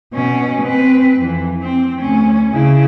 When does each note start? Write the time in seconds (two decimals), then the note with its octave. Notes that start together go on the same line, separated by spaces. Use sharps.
0.13 B2 C#4
0.62 C4 B4
1.18 F2 E3
1.62 C4
2.01 D2 C#4
2.53 C#3 E4